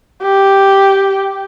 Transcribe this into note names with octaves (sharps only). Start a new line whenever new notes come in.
G4